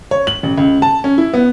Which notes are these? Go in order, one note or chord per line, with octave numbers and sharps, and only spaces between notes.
C#5
F#7
A1
C#2
A5
C#4
E4
B3